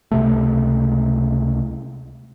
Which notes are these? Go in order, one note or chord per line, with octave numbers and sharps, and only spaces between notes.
C#2 C3 A3